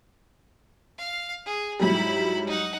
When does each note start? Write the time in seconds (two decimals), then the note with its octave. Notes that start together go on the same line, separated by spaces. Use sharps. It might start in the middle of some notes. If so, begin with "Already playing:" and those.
0.98 F5
1.46 G#4
1.80 G#2 F#3 G3 E4 B5
2.47 D#4 F#5